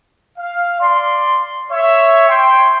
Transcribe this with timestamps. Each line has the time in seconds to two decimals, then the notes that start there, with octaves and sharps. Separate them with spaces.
0.38 F5
0.79 D5 C6
1.71 C#5 E5
2.28 G5 C6